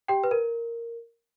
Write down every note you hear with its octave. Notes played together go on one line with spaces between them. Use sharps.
G4 G5
B4
A#4